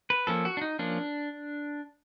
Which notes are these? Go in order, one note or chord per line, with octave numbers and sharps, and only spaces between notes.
B4
F3 A#3 C#4 A4
F#4
D4
D#4
F3 A#3 C#4 D4